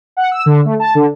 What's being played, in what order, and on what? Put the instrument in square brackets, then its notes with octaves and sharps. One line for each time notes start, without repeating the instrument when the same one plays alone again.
[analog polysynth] F#5
E6
D3
A3
A5
D3